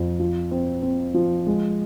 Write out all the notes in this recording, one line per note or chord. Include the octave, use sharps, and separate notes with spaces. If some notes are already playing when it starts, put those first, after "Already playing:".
Already playing: F2
F3
C4
C4
F3
G#3